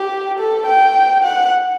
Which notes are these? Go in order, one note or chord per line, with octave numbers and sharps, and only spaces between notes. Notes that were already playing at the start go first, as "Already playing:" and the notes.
Already playing: G4
A4
G5
F#5